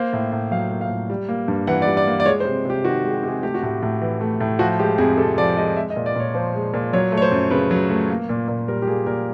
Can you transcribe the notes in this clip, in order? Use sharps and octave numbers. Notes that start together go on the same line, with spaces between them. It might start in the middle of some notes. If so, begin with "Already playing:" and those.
Already playing: A#3 C5
A2
A2
F#3 F5
A#3
F5
A2
G3
A#3
G2
E3 F#5
D5
G3
D5
A#3
D5
G#3 C#5
C5
C3
C3 G4
D#3 F#4
G#3
G4
C3
G#4
A3 G4
F#4
A2 G4
A2
E3
A3
A2
F3 F#4
G#3 G4
F2 G#4
C3 A4
F3 D5
G#3 D#5
G#3 E5
D#5
A#2
D5
A#2 C#5
F3 C5
G#3
A#2
F#3 C#5
A3
C#5
C5
F#2
C#3 B4
F#3
A3
A#3
A#2
A#2
G3 A#4
G4
A#3 G#4
A#2 A#4